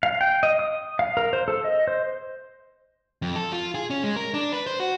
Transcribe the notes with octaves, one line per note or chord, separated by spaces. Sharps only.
F5
G5
D#5
D#6
F5
A#4
C5
A4
D#5
C5
F2
A4
F4
G#4
C#4
G#3
A#4
D4
B4
C5
F#4